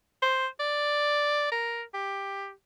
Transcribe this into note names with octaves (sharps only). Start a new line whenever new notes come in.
C5
D5
A#4
G4